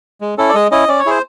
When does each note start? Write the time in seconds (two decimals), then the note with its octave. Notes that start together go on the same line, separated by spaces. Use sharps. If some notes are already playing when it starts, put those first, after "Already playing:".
0.21 G#3
0.37 C#4 E4 A4
0.49 D5
0.54 G#3 D#5
0.71 C#4 E4 D#5
0.88 C#4 D5
0.99 C#5
1.06 E4 G#4 C5